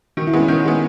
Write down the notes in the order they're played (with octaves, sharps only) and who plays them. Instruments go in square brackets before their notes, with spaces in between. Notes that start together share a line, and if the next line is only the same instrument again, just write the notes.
[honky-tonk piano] D#3 [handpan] F#4
[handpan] E4
[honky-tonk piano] G#3 B3 [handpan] C#4
[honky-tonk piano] D#3 [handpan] D#4
[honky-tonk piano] G#3 B3